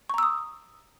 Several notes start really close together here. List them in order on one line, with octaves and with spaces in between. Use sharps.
C#6 A#5 E6 D#6